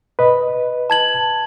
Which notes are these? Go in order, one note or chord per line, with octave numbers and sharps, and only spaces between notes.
B4 D#5
A5 G#6 F#7